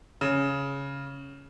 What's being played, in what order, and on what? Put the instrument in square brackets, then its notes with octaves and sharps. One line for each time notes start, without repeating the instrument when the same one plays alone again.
[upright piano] C#3